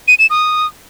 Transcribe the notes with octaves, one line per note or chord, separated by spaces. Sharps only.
D#7
E7
D#6